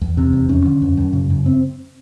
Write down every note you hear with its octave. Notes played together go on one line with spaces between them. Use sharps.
E2
C3
E2
F2 C#4
D3
F2
F#2
C#3
F#2
C4